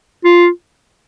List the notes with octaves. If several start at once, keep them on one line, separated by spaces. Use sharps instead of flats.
F4